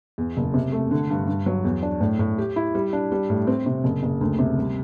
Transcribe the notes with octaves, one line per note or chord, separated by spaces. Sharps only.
E2
F#1
C3
A3
D3
G2
G2
F#3
E2
D4
A2
A2
G4
E4
G3
D4
G3
A2
C4
C3
F#1
F#1
D2
C3
G3